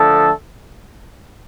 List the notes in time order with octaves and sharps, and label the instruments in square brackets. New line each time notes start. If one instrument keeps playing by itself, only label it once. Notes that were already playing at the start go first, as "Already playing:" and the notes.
Already playing: [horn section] D3 F3 A3 A4